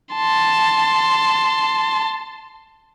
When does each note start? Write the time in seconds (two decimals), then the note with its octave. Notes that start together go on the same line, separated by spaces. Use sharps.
0.14 A5 C6